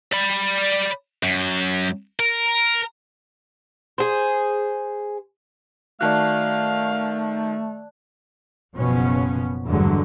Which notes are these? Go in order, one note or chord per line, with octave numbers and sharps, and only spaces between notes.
D5 B5
F#2
A#4
G#4 C5
D#3 A3 F#4 D5 F5 A5 F#6
F#1 B2 F3 B3 C#4
G#1 E2 G2 D3 F#3 G#3